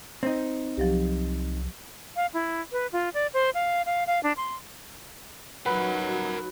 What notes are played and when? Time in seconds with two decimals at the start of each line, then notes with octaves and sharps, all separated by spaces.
0.23 C4 D#4
0.77 C2 F3 F#3 G4
2.15 F5
2.34 E4
2.72 B4
2.92 F4
3.14 D5
3.34 C5
3.54 F5
3.86 F5
4.07 F5
4.23 D4
4.37 C6
5.66 F#3 D#4 F#4 A#4 B4 F#5